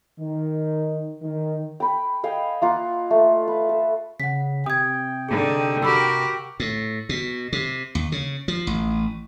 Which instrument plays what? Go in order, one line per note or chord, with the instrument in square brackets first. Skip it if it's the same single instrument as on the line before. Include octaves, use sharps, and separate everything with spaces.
[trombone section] D#3
D#3
[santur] G5 B5
D#5 F5 G5 G#5
A#3 F4 F#5
A3
B4
A4
[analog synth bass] C#3 [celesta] F#5 B6
[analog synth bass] C3 [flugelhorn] G5 [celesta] D#6 G#6
[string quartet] D3 D#4 [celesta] G#4
[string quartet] F#4 G4 A#4 [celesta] B5 E6
[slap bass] A2
B2
C3
D#2
C#3
F3
A1